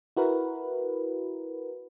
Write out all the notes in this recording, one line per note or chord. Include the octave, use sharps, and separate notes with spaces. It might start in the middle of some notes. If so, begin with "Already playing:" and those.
E4 F#4 A#4 B4